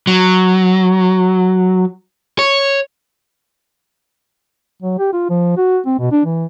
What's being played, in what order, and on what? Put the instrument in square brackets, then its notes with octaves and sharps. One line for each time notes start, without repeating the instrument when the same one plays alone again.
[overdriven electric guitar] F#3
C#5
[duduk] F#3
G4
F4
F3
F#4
C4
B2
D4
E3